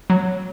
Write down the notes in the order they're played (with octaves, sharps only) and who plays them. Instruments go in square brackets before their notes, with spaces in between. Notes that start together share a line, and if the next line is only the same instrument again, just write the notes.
[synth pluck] F#3